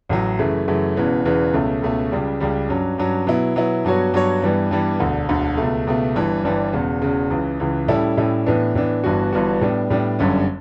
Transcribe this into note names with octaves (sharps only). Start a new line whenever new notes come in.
A1 A2 F#3
F#2 C#3 E3 A3
F#2 C#3 E3 A3
E1 E2 C#3 E3 B3
E1 E2 C#3 E3 B3
C#2 B2 A3 C#4
C#2 B2 A3 C#4
C#2 C#3 G3
C#2 C#3 G3
G2 F#3 C#4
G2 F#3 C#4
B2 F#3 B3 E4
B2 F#3 B3 E4
G2 F#3 B3 F#4 C#5
G2 F#3 B3 F#4 C#5
G2 E3 G3 B3
G2 E3 G3 B3
E1 D2 D3
E1 D2 D3
C#2 B2 A3
C#2 B2 A3
G1 G2 E3 G3
G1 G2 E3 G3
E1 E2 C#3
E1 E2 C#3
C#2 C#3 E3
C#2 C#3 E3
A2 G3 C#4 E4 A4
A2 G3 C#4 E4 A4
A2 E3 B3 D4
A2 E3 B3 D4
G1 G2 E3 B3 F#4
G1 G2 E3 B3 F#4
A2 G3 B3 D4
A2 G3 B3 D4
G1 F#2 D3 G3 C#4